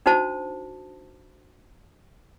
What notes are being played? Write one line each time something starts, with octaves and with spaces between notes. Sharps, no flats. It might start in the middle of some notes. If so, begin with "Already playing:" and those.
D4 D#4 F#4 C5 A5